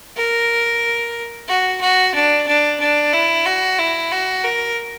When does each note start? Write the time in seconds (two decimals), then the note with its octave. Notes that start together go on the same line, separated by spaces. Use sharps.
0.17 A#4
1.48 F#4
1.81 F#4
2.14 D4
2.47 D4
2.80 D4
3.13 E4
3.45 F#4
3.79 E4
4.12 F#4
4.44 A#4